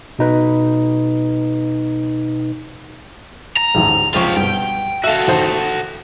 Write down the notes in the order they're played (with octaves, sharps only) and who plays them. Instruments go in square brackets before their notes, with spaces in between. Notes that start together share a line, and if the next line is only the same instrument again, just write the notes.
[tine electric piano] B2 D#4 B4
[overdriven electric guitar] A#5
[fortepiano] A1 D2 G#2
[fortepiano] C#2 F3 C#6 [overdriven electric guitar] F4 G4
[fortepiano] G2 B2 [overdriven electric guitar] G5
[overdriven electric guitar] F#4 A4 [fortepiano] E5 F5
[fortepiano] A1 D#3 C5